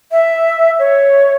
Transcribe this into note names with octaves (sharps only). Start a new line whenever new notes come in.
E5
C#5